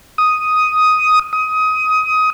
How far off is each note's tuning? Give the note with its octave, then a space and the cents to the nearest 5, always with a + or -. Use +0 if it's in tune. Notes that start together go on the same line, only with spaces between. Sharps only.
D#6 +5
D#6 +20